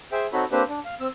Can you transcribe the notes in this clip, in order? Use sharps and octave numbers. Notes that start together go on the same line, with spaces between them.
G#4 C5 E5 G5
C4 D#4 F#4 A4 C#5 B5
A#3 C4 D4 G4 B4 C5
D4
F5
C4 E6